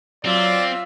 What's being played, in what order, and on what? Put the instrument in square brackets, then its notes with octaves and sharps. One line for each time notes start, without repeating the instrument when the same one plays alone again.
[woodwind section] F#3 [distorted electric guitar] C4 [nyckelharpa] F4 E5 [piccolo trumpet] D5